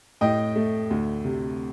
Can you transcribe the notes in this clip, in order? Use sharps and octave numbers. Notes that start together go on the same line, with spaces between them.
A2 D#5 G5
A3
D2
C3